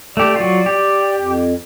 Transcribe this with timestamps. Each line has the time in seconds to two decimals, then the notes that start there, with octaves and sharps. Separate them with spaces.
0.17 A3 G4 D5
0.36 F#3 F4
0.66 G4
1.18 F2